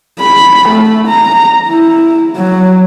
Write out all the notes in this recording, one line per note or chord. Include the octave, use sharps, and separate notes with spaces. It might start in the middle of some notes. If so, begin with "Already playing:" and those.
B5
A3
A#5
E4
F#3